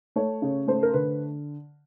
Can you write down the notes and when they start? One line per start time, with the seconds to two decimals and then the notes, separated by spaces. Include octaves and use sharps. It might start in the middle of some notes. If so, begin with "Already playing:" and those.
0.16 A3 C#5
0.42 C#3
0.67 A3 C5
0.83 A#4
0.93 D3 B4